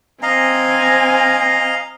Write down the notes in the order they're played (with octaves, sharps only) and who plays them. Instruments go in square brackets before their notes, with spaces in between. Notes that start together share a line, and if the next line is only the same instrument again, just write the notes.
[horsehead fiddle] C4 G#5 [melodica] D#5 F5 A#5